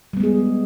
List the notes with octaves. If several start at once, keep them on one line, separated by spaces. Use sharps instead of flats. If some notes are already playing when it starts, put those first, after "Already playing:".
G3 G#3 B3 G#4